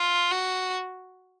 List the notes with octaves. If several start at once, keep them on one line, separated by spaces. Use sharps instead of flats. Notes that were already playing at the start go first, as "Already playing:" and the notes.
Already playing: F4
F#4